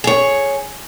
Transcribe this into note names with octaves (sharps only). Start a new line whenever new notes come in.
G#4 C#5